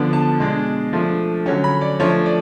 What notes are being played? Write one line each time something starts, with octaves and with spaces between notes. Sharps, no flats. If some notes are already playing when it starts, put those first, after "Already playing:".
Already playing: D3 F3 B3 D4
A5
B2 G#3 D4
F3 A3 D4
D3 F#3 C#4
B5
D5
F3 A3 D4 C#5
D5